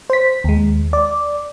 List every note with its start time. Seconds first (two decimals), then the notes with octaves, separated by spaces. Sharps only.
0.10 C5 B6
0.44 D#2 G#3
0.93 D5